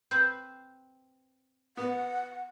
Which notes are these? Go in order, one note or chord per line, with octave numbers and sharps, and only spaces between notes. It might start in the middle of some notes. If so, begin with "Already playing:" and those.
C4 B4 C5 G6
B3 F#5